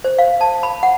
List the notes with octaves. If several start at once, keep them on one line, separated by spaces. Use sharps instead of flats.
C5
F5
A5
B5
F#5